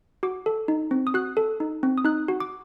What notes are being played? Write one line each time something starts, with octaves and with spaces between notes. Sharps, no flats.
F#4 D6
A4
D#4
C4
D#6
F#4 F#6
A4
D#4
C4
D#6
D#4 F#6
F#4
D6